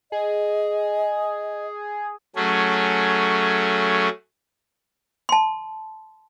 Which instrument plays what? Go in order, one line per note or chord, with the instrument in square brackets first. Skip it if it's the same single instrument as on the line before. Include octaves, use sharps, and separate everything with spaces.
[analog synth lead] G#4 [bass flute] D#5
[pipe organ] F#3 A3 C#4 G#4
[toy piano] A5 C6